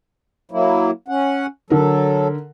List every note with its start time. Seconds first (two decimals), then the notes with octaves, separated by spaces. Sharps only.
0.51 F#3 A#3 E4
1.08 C#4 F#5
1.70 D3 F#3 A4 A#4